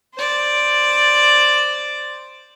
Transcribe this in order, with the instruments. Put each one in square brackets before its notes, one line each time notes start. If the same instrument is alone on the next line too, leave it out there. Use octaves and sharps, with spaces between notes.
[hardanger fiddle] C5 D5